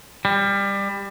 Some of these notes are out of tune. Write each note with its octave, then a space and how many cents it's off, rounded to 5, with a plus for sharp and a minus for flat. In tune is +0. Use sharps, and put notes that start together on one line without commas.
G3 +20